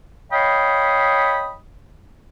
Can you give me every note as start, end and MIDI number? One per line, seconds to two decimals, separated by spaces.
0.32 1.54 73
0.32 1.54 75
0.32 1.54 77
0.32 1.54 79
0.32 1.54 83
0.32 1.54 87